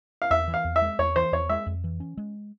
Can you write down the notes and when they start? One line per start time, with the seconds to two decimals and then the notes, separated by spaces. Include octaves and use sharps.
0.22 F5
0.30 E2 E5
0.48 E3
0.54 F5
0.64 E2
0.76 E5
0.82 G#3
0.99 E2 C#5
1.16 E3 C5
1.32 E2 C#5
1.49 G#3 E5
1.66 F2
1.84 E3
2.00 C#4
2.17 G#3